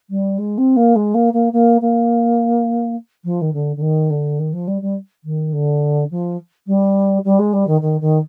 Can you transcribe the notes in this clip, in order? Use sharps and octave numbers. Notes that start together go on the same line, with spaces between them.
G3
G#3
C4
A#3
G#3
A#3
A#3
A#3
A#3
F3
D#3
D3
D3
D#3
D3
D#3
F3
G3
G3
D#3
D3
F3
G3
G3
G#3
G3
D#3
D#3
D#3